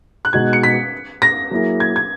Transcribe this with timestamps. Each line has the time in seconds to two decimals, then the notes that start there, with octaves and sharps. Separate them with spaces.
0.25 F#6
0.33 B2 G#3 D#4 F#4 G#6
0.53 C#7
0.63 B6
1.22 A#6
1.51 F#3 A#3 E4 G#4
1.80 G#6
1.96 G#6